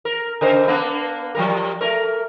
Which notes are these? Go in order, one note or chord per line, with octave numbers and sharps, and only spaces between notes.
A#4
C#3 A#4 C5
A#3 B3 D4
F3 G3 A#4
A3 A#4